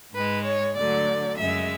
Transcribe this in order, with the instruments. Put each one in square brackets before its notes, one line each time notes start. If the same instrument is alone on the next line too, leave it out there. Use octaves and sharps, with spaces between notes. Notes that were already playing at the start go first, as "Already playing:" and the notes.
[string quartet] G#2 G#3 B4
C#5
D2 D3 F#3 D5
F#2 C#3 G#3 E5